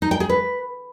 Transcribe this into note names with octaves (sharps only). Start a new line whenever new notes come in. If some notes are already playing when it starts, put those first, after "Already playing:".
D#4
G5
G#4
B4